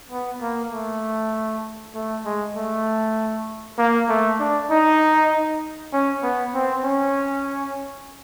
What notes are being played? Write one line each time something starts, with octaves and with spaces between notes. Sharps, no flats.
B3
A#3
A3
A3
G#3
A3
A#3
A3
D4
D#4
C#4
B3
C4
C#4